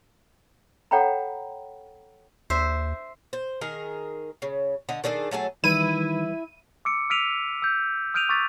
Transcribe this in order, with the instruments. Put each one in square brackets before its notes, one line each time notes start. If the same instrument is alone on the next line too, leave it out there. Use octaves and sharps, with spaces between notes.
[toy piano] A4 C#5 F#5 G5 A#5 B5
[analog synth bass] D#2 [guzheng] C5 E5
[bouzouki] C5
D#3 G#4 A#4
C#3
D3 D#5
D#3 D4 G#4 A4
F#3 A3 G#4 A4
[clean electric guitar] D#3 [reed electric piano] E3 G3 B4 [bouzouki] E4 [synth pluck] D#7
[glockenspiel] D6 E6 C#7 D7
E6 F6 B6 D7 D#7 F7
E6 G6
D#6 F6 G6 D7 D#7 F7
C#6 D6 E6 F#6 A6 B6